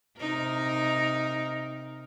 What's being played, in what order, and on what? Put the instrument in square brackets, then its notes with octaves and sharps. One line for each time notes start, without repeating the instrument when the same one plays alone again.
[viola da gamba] C3 D#4 A#4